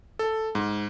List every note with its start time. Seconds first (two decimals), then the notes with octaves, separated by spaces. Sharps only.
0.19 A4
0.55 G#2